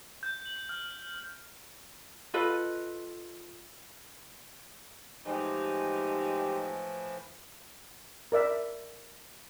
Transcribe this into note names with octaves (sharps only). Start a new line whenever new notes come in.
G6
F#7
F6
F4 A4 B4 D#5
A2 E3 F3 G#3 D#4 G4
A#4 D5 E5